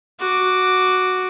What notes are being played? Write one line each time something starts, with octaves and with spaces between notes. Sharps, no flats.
F#4 D6